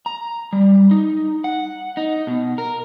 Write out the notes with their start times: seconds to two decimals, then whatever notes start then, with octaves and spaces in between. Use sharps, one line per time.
0.06 A#5
0.53 G3
0.91 D#4
1.44 F#5
1.97 D#4
2.27 B2
2.58 A#4